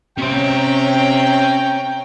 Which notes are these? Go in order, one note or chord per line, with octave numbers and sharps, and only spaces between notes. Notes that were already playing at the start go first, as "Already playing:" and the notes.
C3 C#4 C#5 G5 A#5 C6